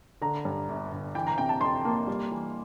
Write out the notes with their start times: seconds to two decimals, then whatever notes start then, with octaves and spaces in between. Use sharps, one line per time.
0.21 D3 A#5
0.45 G2
0.68 G1
0.91 G1
1.15 E3 G5
1.27 A#5
1.38 C3 G5
1.49 A5
1.61 F2 C6
1.85 A#3
2.07 G3
2.31 E3